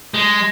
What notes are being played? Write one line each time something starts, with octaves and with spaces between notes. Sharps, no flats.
G#3